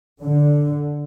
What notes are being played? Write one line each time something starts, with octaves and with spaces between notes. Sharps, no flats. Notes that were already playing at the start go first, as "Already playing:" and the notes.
D3